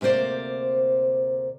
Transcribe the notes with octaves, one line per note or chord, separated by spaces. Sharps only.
D2 C3 A#3 C5 D5